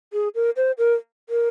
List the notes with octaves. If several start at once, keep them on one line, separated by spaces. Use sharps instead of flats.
G#4
A#4
C5
A#4
A#4